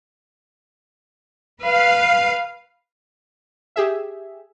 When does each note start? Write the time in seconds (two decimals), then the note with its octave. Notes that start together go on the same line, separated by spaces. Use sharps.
1.62 B4 F5
3.76 G4 G#4 E5